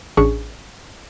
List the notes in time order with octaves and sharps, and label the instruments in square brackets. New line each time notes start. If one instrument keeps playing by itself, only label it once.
[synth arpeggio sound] A1 C#4 D4 G#4 C#6